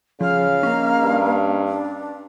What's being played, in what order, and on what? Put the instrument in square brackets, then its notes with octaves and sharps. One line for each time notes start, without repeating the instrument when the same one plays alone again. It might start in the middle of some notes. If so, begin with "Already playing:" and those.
[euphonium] C#3 [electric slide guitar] F3 [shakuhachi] F5
[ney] A#3 [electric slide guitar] C#4 D#5 A#5
[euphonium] G2
[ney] D4